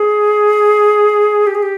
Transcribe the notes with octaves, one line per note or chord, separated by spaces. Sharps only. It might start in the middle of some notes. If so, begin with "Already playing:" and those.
Already playing: G#4
G4
G#4
G4